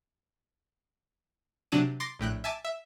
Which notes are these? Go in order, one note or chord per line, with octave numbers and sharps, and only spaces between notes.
C3 F#3 D4 D#7
C6 D6 A6 A#6 C7
A#1 A2 G5 F#6
E5 G#5 A5 D6
E5